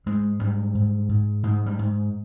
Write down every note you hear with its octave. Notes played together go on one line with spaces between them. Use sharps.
G#2 G#3
G#2 G3
G#2
G#2
G#2 G#3
G3
G#2